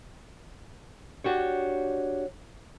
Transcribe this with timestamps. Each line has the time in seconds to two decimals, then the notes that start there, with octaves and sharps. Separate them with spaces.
1.24 D4 F#4 G4 C#5